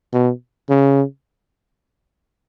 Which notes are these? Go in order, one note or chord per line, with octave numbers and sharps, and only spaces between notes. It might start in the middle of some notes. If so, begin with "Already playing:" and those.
B2
C#3